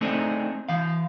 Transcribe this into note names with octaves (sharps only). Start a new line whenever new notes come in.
A3 C4 D4 D#4 G#4
E3 F5